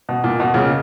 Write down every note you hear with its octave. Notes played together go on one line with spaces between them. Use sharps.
B2
A#2
B2
A#2 C#3